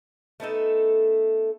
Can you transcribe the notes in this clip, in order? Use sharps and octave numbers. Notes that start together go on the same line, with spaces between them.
A3 B3 D#4 A4